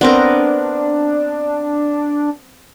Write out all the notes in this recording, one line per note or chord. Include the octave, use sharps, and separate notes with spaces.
B3 C4 D4 A#4